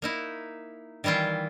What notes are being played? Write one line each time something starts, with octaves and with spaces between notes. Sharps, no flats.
A#3 D#4 E4
D#3 E3 G3 E4 F4